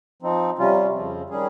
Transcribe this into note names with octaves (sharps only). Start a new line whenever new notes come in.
F3 C4 D#4
C3 G3 C#4 F4
F2 C#3 F3 C4
D#3 G3 C#4 G#4